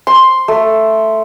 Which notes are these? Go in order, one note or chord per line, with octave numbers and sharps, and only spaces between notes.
C6
A3